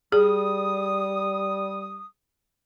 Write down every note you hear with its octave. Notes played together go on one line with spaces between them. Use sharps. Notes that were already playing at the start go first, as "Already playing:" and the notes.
G3 G#4 D#6